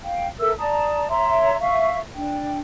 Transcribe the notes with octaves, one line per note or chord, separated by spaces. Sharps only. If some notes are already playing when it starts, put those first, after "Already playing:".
F5 G5
A4 A#4 E5 E6
D5 A5 A#5 D#6
C#5 E5 A#5 C6
E5 F5 C#6
D4 G5